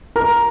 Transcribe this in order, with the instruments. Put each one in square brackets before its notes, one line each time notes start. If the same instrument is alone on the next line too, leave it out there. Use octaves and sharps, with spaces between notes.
[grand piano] A#4 A#5